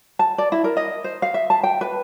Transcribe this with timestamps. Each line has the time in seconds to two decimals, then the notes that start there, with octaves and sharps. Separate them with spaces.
0.19 A5
0.38 D5
0.52 E4
0.64 A#4
0.77 D#5
1.04 C5
1.22 F5
1.34 E5
1.50 A5
1.63 G5
1.81 B4